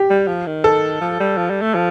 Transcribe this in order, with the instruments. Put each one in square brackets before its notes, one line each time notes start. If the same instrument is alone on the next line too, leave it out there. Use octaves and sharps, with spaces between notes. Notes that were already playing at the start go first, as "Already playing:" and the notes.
Already playing: [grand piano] G4
[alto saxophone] G3
F3
D#3
[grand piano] A4
[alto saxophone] F3
G3
F3
G3
A3
F3